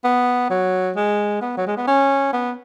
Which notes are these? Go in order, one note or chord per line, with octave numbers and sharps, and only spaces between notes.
B3
F#3
G#3
B3
F#3
G#3
B3
C#4
B3